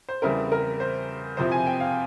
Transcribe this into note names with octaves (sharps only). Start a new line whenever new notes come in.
C5
E2 C#3 G3 C4 E4 A#4
A#4
C5
F2 C3 F3 C4 E4 C5
G#5
G5
F5